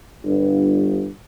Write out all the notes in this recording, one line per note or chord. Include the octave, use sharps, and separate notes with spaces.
G1 G2